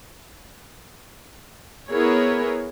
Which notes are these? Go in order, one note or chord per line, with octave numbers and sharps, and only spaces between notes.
B3 E4 G#4 A#4 C#5